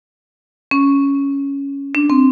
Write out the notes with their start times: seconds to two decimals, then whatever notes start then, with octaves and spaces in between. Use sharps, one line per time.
0.71 C#4
1.95 D4
2.10 C4